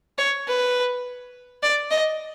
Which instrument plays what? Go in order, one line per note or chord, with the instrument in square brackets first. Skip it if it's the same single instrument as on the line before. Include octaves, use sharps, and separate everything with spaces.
[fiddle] C#5
B4
D5
D#5